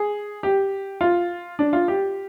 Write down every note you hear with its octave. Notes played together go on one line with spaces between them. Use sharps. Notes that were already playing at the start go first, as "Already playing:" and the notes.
Already playing: G#4
G4
F4
D4
F4
G4